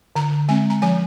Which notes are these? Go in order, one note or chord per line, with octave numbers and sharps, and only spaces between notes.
D3 A#5
G#3 C4 G#5
A#5
F3 G#5